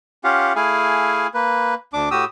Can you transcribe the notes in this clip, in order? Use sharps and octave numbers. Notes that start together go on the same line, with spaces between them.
C#4 F4 G4 F5 F#5
A3 E4 G#4 F5 G#5
A#3 B4
D2 D4 D6
A2 F#4 G4 D#6 E6